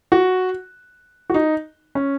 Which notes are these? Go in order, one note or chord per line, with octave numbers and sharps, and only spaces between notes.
F#4
F#4
D#4
C#4